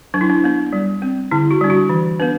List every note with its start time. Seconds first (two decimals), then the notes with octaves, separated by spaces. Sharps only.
0.14 F#3 D4
0.21 E4
0.29 D4
0.44 B3 D4
0.73 G3
1.02 C4
1.31 D3 E4
1.51 F#4
1.61 G3 D4
1.70 F#4
1.89 E3
2.20 B3 D4 B4